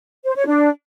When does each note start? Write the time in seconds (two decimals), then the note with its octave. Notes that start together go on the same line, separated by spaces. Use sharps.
0.24 C5
0.35 C#5
0.47 D4